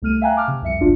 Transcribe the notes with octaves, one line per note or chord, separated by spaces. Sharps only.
C2 A3 F6 D#7
E5 F5 G5 G#5 A#5 F#6
F5 G#5 A5 D6 F6
C3
C2 F2 E5 C#7
G1 C#2 D4 F4